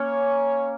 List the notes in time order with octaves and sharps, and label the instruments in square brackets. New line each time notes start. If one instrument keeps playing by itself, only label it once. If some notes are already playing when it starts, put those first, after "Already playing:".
Already playing: [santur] A#3 C#4 [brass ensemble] C#5